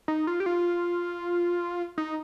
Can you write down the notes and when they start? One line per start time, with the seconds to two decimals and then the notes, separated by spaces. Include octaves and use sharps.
0.08 D#4
0.27 F4
0.40 G4
0.46 F4
1.98 D#4